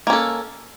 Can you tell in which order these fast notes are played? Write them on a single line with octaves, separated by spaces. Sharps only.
A#3 C#4 A4